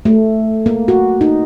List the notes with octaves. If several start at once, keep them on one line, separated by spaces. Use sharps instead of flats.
A3
A#3
F#4
D#4